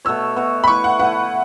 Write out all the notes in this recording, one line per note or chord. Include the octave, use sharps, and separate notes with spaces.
B2 A3 F#4 C#5 E6
B2 A3 F#4 C#5
B5
A3 E4 B4 C#6
F#5
A3 E4 B4 F#5